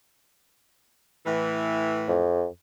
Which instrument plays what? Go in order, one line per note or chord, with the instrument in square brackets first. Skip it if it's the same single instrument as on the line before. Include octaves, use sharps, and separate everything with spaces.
[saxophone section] A2 E3
[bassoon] F2